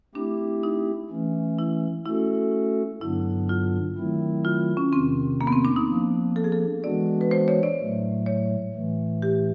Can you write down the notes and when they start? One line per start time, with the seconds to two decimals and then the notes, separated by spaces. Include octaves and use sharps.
0.15 A3 C4 D4 E4 G4
0.63 D#4
1.10 E3 A3 C#4
1.59 E4
2.06 A3 C#4 E4 F#4 A4
3.01 G2 D3 F#3 B3 D4 E4
3.49 F4
3.97 D#3 F#3 A3 C4 E4
4.45 F4
4.77 C#4
4.93 E2 C3 D#3 C4
5.41 A#3
5.47 B3
5.52 C4
5.65 D4
5.76 D#4
5.89 F3 A#3 D4
6.36 A4
6.44 G#4
6.52 A4
6.84 E3 G#3 B3 D4 F#4 D5
7.21 B4
7.31 C5
7.48 C#5
7.63 D5
7.79 A2 F#3 A3
8.26 C#5
8.74 A2 E3 A3
9.22 G4